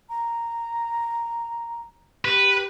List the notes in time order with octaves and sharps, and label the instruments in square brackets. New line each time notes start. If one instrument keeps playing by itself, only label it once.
[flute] A#5
[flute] G4 [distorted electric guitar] B4